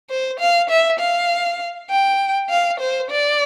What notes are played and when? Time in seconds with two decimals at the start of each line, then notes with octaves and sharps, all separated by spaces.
0.10 C5
0.40 F5
0.70 E5
1.00 F5
1.90 G5
2.50 F5
2.80 C5
3.11 D5